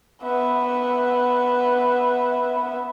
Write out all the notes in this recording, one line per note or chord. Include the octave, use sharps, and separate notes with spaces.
B3 E5